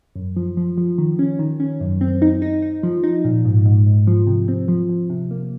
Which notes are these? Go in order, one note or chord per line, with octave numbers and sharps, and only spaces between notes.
F#2
F3
F3
F3
D#3
C#4
D#3
C#4
F#2
C4
D#4
D#4
D#4
F3
D#4
A#2
G#2
G#2
G#2
F3
C3
C4
F3
F3
C3
A#3